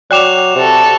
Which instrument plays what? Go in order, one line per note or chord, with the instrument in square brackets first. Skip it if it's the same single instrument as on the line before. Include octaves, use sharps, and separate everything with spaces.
[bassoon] F#3 [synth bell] D5 G5 D6 [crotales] F#6 E7 F7
[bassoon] C3 [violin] F#4 A4